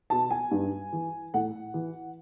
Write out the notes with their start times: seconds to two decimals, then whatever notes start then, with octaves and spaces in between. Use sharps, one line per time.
0.10 B2 A5
0.31 G#5
0.51 G2
0.93 E3
1.34 A2 F#5
1.74 E3